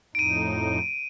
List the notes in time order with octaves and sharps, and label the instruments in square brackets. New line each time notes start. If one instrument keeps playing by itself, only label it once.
[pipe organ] F2 A2 D#4 [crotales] D7 D#7